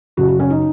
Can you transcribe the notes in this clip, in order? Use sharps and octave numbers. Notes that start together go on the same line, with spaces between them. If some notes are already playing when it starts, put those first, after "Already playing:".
F#2 C#3 F#4
F#4
C#4
D#4